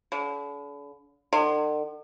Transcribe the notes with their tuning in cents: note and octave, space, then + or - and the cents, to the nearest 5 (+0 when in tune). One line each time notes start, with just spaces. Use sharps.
D3 -45
D3 +45